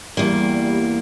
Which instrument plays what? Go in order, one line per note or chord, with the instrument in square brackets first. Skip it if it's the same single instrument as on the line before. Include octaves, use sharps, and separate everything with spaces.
[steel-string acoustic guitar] E2 A#3 [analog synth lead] G3